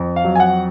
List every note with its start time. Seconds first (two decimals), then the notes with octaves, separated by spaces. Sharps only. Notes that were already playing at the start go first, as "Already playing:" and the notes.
Already playing: F2
0.16 F5
0.24 F#3
0.35 G#5
0.40 F#5